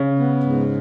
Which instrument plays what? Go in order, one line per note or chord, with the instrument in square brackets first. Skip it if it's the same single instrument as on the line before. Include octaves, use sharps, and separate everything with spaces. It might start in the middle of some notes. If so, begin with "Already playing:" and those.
Already playing: [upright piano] C#3
[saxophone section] B3
G#2